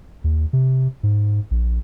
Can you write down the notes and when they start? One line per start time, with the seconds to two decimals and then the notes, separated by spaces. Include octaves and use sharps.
0.24 D#2
0.53 C3
1.03 G#2
1.51 A#1